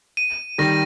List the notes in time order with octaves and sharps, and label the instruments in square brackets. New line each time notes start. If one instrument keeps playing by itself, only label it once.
[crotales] D#7
[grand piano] D#3 G3 [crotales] A#6